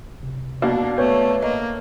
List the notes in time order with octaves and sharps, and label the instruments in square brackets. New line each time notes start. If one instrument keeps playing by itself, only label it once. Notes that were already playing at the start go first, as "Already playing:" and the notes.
[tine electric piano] C3
[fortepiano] B2 A#3 [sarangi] D4 [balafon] F#4
[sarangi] A3 [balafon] B3 [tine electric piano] B4 C#5
[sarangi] A#3 [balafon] D#5